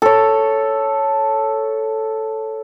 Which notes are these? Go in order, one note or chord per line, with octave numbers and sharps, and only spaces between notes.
A4 C#5